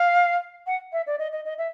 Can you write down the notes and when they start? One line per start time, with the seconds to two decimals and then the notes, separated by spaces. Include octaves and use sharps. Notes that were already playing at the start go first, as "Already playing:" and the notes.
Already playing: F5
0.67 F#5
0.93 E5
1.07 D5
1.19 D#5
1.32 D#5
1.45 D#5
1.58 E5